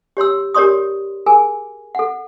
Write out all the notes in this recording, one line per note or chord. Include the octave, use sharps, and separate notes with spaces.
G4 C#5 C6 E6
G4 A#4 C#5 D5 C6 D#6
G#4 A#4 G#5
A4 F#5